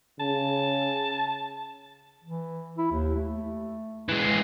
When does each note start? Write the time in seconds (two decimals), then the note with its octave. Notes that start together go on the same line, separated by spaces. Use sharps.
0.20 C#3 A5
2.24 E3
2.78 E4
2.92 D#2
3.16 A3
4.08 E3 G#3